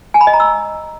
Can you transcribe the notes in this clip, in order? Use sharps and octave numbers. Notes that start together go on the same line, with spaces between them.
G#5
B5
D#5
A#5
E6